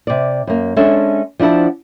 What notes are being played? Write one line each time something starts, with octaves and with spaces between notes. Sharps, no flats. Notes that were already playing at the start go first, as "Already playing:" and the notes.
C3 D5
F#2 A#3
G#3 C#4 D4 A4 E5
F3 D4 E4 F#5 A5